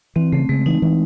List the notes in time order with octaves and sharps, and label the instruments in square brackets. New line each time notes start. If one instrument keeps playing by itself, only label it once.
[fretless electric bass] E3 [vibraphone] C4
[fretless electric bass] C#3 [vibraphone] A3
[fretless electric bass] C#3 [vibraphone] G#3
[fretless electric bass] E3 [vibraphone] D#4
[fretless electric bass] E3